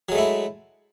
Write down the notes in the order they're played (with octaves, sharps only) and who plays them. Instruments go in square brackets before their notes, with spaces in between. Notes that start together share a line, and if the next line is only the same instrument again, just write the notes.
[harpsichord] F#3
G#3
A3
E4